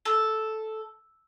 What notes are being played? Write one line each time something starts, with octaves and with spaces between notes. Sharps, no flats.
A4